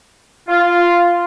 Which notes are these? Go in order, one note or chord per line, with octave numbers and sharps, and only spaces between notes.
F4